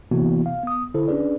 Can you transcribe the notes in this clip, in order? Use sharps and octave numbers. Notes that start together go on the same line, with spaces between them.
C3 E3 A#3 B3 E4 F#4
F5
B3 D#6
D3 E4 A4 C5
C#4 D4 G#4 B4 D5